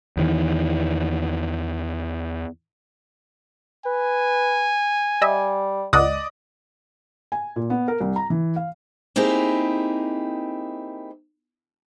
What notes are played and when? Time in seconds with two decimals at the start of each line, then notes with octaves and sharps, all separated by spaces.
0.17 E2 D#3 E3
3.86 B4 G#5
5.22 G3 D#5 E5
5.93 C#2 D5 D#5 F#5 D#6
7.32 G#5
7.56 A#2
7.70 B3
7.88 A#4
8.01 C2
8.16 A#5
8.30 E3
8.56 F5
9.16 A#3 C4 D#4 E4 G4 G#4